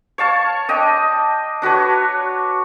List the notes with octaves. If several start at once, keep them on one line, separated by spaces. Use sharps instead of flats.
C#5 F5 A5 C#6
D4 D#5 G5
D4 F#4 B4 C#5